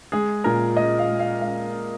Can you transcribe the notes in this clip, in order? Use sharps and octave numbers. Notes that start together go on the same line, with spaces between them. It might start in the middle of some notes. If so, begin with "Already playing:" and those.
G#3 G#4
A#2 A#4
G#3 D#5
F5
G#3
F5
G#3 F5